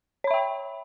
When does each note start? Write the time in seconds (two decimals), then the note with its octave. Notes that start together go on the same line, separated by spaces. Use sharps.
0.24 C#5
0.27 B5
0.31 E5
0.34 G5